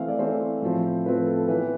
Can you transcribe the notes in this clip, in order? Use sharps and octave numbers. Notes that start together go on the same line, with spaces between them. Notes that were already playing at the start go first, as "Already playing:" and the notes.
Already playing: E3 A3 C4 F5
D5
E3 A3 C4 C5
A2 F3 C4
A2 F3 C4 B4
A4
E3 B3 B4